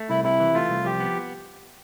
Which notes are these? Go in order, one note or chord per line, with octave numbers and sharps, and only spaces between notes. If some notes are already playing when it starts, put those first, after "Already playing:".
Already playing: A3
C2 E4
C3 E4
E3
A3 F4
C2
F3 G4
B3